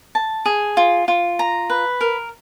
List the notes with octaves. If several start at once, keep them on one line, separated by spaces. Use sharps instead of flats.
A5
G#4
F4
F4
A#5
B4
A#4